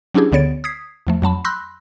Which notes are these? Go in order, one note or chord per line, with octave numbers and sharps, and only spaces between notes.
F#3 C#4 D4 E4 G4 G#4
D2 D3 B3 C#5 A6 D7
D#6 G#6 B6 C7
E2 F3 A3
F2 F#3 A5 B5
B5 C6 E6 F#6 G6 A#6